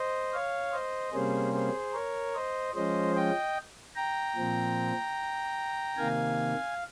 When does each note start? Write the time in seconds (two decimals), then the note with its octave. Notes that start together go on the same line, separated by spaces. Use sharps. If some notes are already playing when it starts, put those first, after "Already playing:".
Already playing: C5 D#5
0.33 C#5 F5
0.72 C5 D#5
1.13 C3 G3 A#3 C#4 G#4 C5
1.53 G#4 C5
1.93 A#4 C#5
2.35 C5 D#5
2.74 F3 G#3 C#4 C5 D#5
3.15 D#5 G5
3.95 G5 A#5
4.36 A#2 F3 C4
5.97 C3 D#3 A#3 F5 G#5